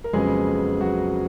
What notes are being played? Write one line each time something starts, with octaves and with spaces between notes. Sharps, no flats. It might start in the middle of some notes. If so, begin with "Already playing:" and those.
A#4
F2 C#3 F#3 G#3 B3 G#4
F#3 F#4